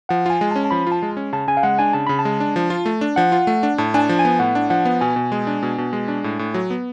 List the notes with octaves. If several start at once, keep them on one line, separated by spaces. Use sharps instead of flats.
F3 F#5
F4 G#5
G#3
C#4 A5
A5
F3 B5
F4 A5
G#3
C#4
C#3 A5
C#3 G#5
F5
G#3 F#5
D4 G#5
C#3 A5
C#3 B5
A5
G#3
D4
F3
F4
A3
D4
F3 F#5
F4
A3
D4
A2 A5
D4 G#5 A5
F3
G#5
B3
A2 F#5
D4
F3 F#5
B3
B2 G#5
B2
G#3
D4
B2
B2
G#3
D4
A2
A2
F#3
B3